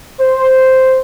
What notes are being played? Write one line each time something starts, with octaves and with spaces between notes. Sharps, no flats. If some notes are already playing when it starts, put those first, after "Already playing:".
C5